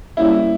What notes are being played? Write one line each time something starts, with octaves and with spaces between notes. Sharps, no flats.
G3 A#3 C#4 E4